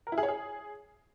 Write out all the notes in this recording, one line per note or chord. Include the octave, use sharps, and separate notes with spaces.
A#4
E4
G#4
C#5
G#4